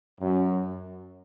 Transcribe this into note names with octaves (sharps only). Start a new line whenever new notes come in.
F#2